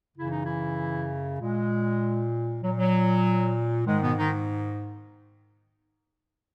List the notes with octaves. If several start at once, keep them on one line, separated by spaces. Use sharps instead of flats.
F#2 C#3 E3 E4
D#4
E3 E4
A#2 G#3
A#2 F#3
F#3
G#2 D#3 G#3
B2 B3
D#3 D#4